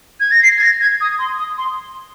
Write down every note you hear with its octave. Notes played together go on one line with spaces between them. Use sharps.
G#6
A#6
C7
G#6
A#6
G#6
D#6
C6
D#6
C6